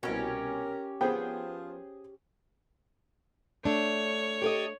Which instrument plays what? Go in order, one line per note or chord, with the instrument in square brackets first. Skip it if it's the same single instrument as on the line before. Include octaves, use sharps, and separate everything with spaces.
[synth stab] C2 B2 [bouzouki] C#4 G4 [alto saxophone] A#4
[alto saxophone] F3 [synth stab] B3 [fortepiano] G#4 C5 G5
[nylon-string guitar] A3 D4 [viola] C#5
[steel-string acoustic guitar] G4 A4 D#5